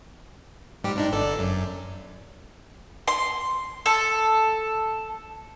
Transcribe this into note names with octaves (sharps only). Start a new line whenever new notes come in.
G#2 G3 G4
G#2 D4 D#4
G1 A4 D5
F#2
C6
A4